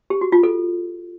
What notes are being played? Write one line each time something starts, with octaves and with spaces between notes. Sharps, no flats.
G4
F#4
F4
A4